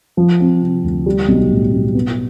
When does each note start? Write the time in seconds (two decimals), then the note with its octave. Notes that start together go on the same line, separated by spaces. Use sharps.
0.17 F3
0.40 C4
0.61 C3
0.84 D2
1.06 G3
1.29 B1
1.51 A2
1.73 B1
1.95 B3